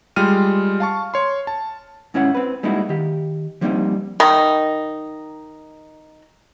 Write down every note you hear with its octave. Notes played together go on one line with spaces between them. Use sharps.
G3 G#3 F4 G5 F6 D#7
F5 A5 C#6
C#5 C6
A5
G#2 C#4 E4 C#5 F#5
C4 B4
G3 G#3 A#3 D#4 E4 F#4
D#3 G4
F3 G3 A#3 C4 C#4 D#4
D#3 D#4